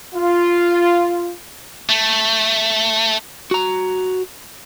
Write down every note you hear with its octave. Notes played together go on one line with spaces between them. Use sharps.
F4
A3
F#4 A#5